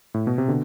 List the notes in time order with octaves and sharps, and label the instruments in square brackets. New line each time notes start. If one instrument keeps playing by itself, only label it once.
[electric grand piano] A2
B2
C3
B2 D3